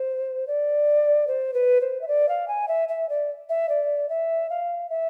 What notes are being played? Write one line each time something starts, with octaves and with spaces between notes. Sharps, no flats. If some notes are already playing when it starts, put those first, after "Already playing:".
Already playing: C5
D5
C5
B4
C5
E5
D5
F5
G#5
E5
E5
D5
E5
D5
E5
F5
E5